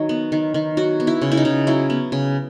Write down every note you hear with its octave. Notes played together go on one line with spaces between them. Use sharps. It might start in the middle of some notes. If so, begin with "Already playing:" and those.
Already playing: D#3 F#3
B3
D#3
D#3
F#3 F#4
B3
E4
C#3
E4
D#4
C#3
F#3 E4
B3
C#3